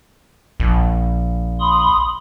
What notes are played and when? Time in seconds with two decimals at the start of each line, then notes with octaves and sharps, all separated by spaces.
0.60 A#1
1.60 B5 C6 D#6